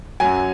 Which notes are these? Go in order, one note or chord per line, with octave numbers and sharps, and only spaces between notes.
F#2 F#3 G#5